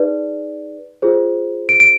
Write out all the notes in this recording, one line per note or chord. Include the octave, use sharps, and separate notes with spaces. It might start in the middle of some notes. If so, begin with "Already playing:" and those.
Already playing: D#4 G#4 B4 D5
F4 G#4 C5
D7
D7